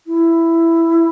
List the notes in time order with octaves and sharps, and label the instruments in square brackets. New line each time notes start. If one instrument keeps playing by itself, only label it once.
[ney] E4